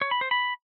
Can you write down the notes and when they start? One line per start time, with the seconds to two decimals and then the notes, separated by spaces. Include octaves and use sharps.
0.01 C#5
0.11 B5
0.21 C5
0.31 B5